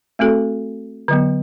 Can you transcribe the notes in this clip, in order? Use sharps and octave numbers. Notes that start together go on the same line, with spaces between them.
A3 C4 F#4 A4
D3 F#3 B3